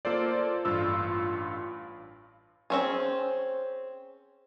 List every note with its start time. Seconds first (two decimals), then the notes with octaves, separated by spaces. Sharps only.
0.05 A#3 F4 A4 C5 D5
0.65 A1 G2 F4 E6
2.70 C4 C#4 G#4